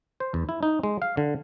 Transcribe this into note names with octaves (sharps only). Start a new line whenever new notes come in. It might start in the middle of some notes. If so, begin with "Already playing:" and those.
C5
E2
E4
D#4
G#3
F5
D3